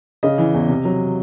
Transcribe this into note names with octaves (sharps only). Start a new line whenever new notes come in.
C#3 D#5
E3
E2
C3
F#3